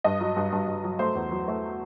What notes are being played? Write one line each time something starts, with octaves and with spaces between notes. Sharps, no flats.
G2 D#5
F#3
G2
G2
G2
F#3
A3 C5
E2
F#3
A3